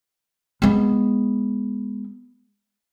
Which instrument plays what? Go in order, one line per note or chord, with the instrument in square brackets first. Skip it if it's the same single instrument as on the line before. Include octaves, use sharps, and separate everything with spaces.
[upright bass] G#3 B3